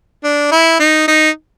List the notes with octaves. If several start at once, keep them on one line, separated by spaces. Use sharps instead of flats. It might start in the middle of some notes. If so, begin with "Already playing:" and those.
D4
E4
D#4
D#4